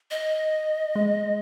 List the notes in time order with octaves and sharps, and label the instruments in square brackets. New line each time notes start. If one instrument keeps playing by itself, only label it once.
[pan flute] D#5
[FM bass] G#3